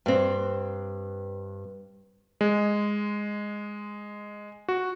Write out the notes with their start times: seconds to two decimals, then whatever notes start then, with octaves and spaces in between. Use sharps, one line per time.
0.06 G2 C4
2.41 G#3
4.68 F#4